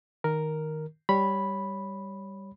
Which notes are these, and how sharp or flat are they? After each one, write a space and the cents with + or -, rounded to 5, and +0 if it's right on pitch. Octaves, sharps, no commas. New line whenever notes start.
D#3 +0 A#4 +0
G3 +0 C#5 +0 B5 -5